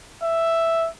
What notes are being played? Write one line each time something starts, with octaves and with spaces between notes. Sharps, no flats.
E5